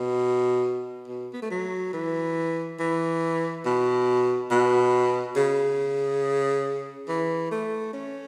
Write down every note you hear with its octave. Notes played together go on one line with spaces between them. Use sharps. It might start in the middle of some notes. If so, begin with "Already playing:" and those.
Already playing: B2
B2
B3
A3
F#3
E3
E3
B2
B2
C#3
E3
A3
C#4